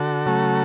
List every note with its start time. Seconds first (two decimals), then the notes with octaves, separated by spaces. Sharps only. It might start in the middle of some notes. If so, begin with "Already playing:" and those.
Already playing: D3 F#4 A4
0.26 C#3 F#3 A3